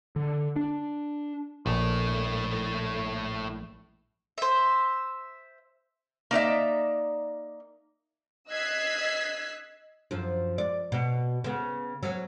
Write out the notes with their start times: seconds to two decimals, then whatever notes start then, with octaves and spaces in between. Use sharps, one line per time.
0.16 D3
0.56 D4
1.66 A#1 A2 A3
4.38 C5 E5
6.31 A#3 D#4 D5 E5
8.49 D#5 E6 F#6 G#6 B6 C7
10.11 F#2 F3
10.58 D5
10.92 B2
11.44 C#3 B3
12.03 F#3 C#4